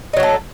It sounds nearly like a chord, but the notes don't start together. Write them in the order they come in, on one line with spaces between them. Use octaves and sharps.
D#4 F#3 F#4 A4